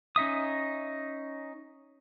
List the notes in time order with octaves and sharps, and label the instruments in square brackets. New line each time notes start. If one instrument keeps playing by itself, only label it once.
[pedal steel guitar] C#4 D#4 E5 D#6